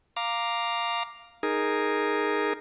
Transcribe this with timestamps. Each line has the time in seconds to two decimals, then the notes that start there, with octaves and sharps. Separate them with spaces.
0.16 F5 A#5 D6
1.43 D#4 G#4 A#4